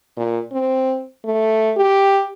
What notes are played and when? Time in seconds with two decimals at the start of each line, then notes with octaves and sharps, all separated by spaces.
0.17 A#2
0.52 C4
1.25 A3
1.77 G4